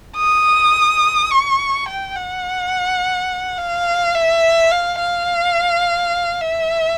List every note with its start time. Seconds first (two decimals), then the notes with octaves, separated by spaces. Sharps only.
0.17 D#6
1.31 C#6
1.88 G5
2.16 F#5
3.58 F5
4.14 E5
4.71 F5
4.99 F5
6.41 E5